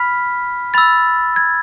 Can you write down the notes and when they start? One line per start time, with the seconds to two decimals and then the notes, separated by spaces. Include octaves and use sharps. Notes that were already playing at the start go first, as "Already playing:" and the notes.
Already playing: B5 F6 B6
0.74 B5 E6 A6
1.36 G#6